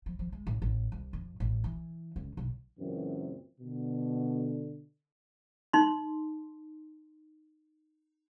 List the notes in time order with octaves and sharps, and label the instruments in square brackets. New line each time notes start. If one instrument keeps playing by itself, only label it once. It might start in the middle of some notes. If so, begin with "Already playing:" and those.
[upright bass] F3
F3
G#3
A1
A1
C2
F2
A1
E3
C#2
B1
[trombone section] C#2 F#2 A#2 E3 C4
B2 D3
[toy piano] D#4 C6